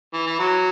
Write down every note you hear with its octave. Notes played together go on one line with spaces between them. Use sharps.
E3
E3
F#3